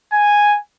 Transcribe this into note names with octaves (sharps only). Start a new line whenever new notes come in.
G#5